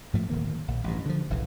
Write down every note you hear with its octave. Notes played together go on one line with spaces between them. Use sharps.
G#2 F3 A3
D1 D2 D#3 A#3
A#1
A1 G2
D3 F3
E1 B1 A2 E3